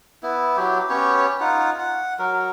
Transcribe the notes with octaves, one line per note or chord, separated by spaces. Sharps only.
B3 E4
F#3 G4
B3 C#4 G4 C#5
D#4 F4 F#5
F#5
F#3 A#4